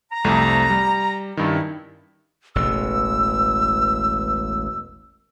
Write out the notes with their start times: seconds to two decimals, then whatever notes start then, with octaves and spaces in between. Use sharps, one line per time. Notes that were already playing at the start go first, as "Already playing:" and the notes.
0.12 A#5
0.24 C2 F2 A3
0.70 G3
1.37 G2 D#3 C#4 E4
2.55 E1 A1 E6